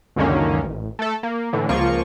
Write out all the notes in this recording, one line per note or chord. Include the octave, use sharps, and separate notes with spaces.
C#2 F#2 D3 D#3 A#3 C#4
A1
A3 A4
A#3
A2 D3 E3
C#2 F3 A#3 F4 C#6